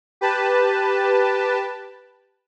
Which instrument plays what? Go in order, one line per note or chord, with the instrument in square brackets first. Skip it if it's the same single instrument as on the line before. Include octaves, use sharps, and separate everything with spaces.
[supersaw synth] G4 B4 A5